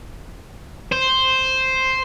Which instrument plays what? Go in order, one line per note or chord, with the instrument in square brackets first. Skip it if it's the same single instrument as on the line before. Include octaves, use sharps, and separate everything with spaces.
[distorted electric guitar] C5